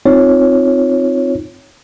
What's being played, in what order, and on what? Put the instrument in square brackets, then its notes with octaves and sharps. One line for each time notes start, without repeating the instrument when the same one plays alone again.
[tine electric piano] C4 D#4 F4 C#5